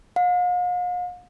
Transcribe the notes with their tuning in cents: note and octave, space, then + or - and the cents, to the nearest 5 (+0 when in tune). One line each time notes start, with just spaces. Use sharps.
F5 +45